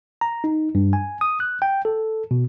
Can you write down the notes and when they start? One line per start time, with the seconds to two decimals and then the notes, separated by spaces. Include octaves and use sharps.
0.21 A#5
0.44 D#4
0.75 G2
0.93 G#5
1.21 D#6
1.40 F#6
1.62 G5
1.85 A4
2.31 B2